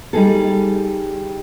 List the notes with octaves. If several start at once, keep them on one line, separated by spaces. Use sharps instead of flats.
G3 D#4 G#4 A4